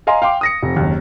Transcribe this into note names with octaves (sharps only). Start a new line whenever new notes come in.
D#5 F5 G#5 A#5 C6
F5 G5 C6 D6
D#6 A#6 C#7
F1
F#1 D#2